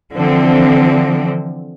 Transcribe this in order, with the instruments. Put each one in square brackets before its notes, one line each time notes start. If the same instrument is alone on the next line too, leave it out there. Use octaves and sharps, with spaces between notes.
[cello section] D3 E3 F3 C4